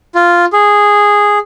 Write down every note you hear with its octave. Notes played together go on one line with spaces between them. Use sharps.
F4
G#4